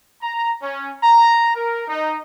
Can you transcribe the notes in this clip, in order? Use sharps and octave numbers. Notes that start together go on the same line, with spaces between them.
A#5
C#4
A#5
A#4
D#4